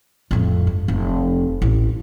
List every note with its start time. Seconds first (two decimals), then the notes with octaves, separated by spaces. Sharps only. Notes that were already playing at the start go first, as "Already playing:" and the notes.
0.31 F2 A2
0.67 G2
0.88 F1
1.62 A1